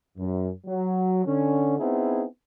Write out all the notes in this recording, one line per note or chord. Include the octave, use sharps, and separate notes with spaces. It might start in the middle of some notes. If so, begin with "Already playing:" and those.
F#2
F#3
D3 C#4
B3 C4 D#4 E4 G#4